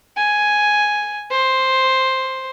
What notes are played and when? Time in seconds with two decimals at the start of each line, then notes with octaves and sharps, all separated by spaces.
0.17 G#5
1.31 C5